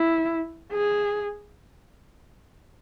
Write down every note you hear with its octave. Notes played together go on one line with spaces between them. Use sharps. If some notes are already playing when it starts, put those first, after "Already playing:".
Already playing: E4
G#4